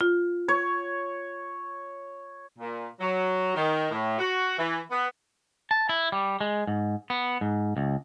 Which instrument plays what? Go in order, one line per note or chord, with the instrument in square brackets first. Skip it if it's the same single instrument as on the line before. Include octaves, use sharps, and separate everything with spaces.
[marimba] F4
[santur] C#5
[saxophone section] A#2
F#3
D#3
A2
F#4
E3
B3
[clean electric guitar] A5
E4
G3
G#3
G#2
B3
G#2
C#2